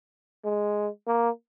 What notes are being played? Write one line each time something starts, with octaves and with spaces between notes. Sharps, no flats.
G#3
A#3